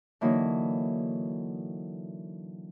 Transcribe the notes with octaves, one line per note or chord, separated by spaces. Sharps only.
D3 E3 F#3 A#3 D#4